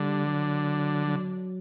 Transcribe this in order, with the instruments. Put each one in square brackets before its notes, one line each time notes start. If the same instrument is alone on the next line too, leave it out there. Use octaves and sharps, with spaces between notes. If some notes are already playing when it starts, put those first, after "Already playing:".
Already playing: [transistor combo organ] D3 [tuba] G3
[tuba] F#3
F#3